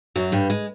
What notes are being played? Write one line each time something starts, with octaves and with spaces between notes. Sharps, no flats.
F#2 F#3
G2 G3
G#3